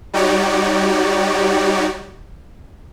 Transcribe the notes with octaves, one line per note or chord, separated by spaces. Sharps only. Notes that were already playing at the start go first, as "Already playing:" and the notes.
G3 D#4 F#4 G4 C#5 D5